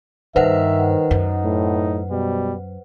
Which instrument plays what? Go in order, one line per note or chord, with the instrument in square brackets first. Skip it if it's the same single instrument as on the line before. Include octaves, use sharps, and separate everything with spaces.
[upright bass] G2 [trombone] D#3 [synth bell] B4 C5 F#5 [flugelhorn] E5
[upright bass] F#2 [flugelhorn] D#4
[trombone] A2
[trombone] B2 [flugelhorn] G3